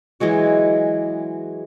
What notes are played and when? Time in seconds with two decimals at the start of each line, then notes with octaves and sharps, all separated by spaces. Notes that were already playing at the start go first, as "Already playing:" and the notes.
0.20 E3 F#3 G#3 F#4